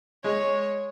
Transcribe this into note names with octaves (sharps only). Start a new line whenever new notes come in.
G#3 C#5